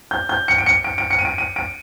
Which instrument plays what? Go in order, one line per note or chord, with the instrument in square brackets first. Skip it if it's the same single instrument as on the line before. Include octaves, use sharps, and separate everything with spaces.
[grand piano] G6
G6
C#7
D7
C#7
D7
D7
C#7
D#7
D7
D#7
D7